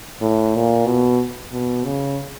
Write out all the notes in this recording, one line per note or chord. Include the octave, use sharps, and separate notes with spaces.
A2
A#2
B2
B2
C#3